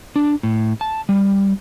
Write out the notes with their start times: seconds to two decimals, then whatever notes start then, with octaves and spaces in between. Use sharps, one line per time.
0.16 D4
0.43 A2
0.81 A5
1.09 G3